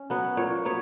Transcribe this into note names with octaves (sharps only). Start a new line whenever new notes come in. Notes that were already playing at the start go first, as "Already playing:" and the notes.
Already playing: C#4
F#3 B3
A#2 C#5
F#3 B3 C#5